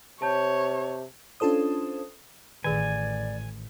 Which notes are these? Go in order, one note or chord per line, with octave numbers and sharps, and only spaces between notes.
C3 C#5 A5 G6
C#4 D4 F4 A4 C5 D#6
A1 D#3 G#4 D5 G#5